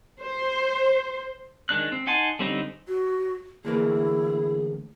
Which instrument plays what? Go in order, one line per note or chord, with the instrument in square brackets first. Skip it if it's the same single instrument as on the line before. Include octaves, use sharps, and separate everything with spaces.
[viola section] C5
[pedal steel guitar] D#3 G#3 D4 F#6
C4
D#4 F#5 G#5 A5 C6
D3 G3 C4 C#4 D#4
[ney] F#4
[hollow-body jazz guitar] D2 E3 A#3 [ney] E4 [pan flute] G#4